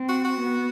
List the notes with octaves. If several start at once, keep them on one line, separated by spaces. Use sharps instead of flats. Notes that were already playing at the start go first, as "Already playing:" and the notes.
Already playing: C4
F#4
F#4
B3